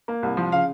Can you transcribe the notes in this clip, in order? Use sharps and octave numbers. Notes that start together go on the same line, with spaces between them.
A#3
C2
F3
C#3 F5